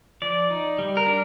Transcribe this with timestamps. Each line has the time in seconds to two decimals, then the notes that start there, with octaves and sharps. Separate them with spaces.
0.22 F3 D5
0.50 D#4
0.79 G3
0.97 A#4
1.06 D4